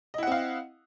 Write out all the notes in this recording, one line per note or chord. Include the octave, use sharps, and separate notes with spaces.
C4 E4 D#5 F5 F#5